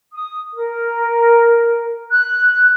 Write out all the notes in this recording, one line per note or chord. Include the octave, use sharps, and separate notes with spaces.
D#6
A#4
F#6